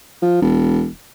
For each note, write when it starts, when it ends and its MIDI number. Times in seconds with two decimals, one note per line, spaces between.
0.22 0.40 53
0.41 0.87 28